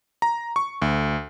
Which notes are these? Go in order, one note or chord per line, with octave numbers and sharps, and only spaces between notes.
A#5
C#6
D2